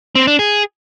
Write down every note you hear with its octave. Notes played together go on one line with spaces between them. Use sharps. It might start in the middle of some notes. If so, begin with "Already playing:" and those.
C4
D4
G#4